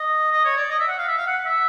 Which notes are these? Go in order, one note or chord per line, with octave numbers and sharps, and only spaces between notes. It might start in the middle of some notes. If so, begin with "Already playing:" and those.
Already playing: D#5
D#5
C#5
D5
D#5
E5
F#5
F5
E5
F5
F#5
E5